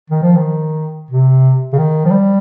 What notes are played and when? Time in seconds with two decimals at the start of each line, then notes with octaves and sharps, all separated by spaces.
0.10 D#3
0.22 F3
0.36 D#3
1.10 C3
1.73 C#3
1.78 D#3
2.05 F3
2.11 G3